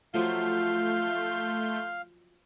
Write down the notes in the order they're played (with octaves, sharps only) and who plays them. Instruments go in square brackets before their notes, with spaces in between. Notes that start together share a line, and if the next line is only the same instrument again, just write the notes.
[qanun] F3 F#3 F4 [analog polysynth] A3 C6 G6 [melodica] F5